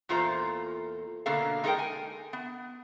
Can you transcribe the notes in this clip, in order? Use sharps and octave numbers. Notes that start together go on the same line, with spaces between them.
E2 A#2 F4 A4 C5 A#5
B2 D3 A#3 A4 F5
G#3 D#4 F4 A4 A#4 G5
G#5
B3